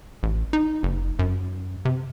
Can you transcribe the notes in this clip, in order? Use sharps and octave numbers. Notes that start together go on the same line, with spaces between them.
A1
D#4
F#1
F#2
C3